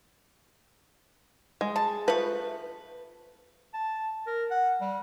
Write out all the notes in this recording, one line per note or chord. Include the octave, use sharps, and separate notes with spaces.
G#3
A5
F3 A3 B4
A5
A#4
F#5
G3